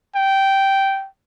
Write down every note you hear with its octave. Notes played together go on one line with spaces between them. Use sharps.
G5